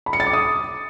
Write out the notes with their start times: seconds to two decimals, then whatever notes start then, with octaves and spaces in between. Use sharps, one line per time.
0.06 B5
0.13 C#7
0.20 A6
0.27 D6
0.33 D#6